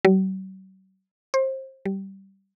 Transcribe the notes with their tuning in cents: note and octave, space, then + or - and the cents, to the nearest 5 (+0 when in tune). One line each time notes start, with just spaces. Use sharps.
F#3 +45
C5 +25
G3 -15